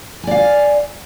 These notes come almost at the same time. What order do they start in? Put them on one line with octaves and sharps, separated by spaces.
G#5 D5 F5